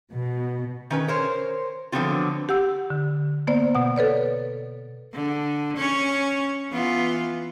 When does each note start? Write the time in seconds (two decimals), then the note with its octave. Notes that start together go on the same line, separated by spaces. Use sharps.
0.12 B2
0.90 D#3 C#4 B4
1.08 A#4 C5 C#5
1.92 D3 F3 F#3 B3 C4 F4
2.49 G4 F#5 E6
2.90 D3
3.47 A#3 B3 C5 D5
3.75 B2 F#5
3.96 A4 B4 C#5 D5
5.13 D3
5.77 C#4 C#5
6.71 E3 B3 F4